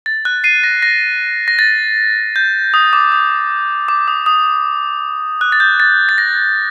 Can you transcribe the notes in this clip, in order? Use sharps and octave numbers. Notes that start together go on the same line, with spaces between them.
A6
F#6
C7 D#7
A#6
A#6
A#6
A6
G6
D#6
D6
D#6
D6
D#6
D#6
F#6
A6
G6
A6
A6
A#6